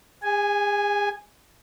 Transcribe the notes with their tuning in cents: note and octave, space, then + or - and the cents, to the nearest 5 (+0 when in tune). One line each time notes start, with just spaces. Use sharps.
G#4 -40 G#5 +0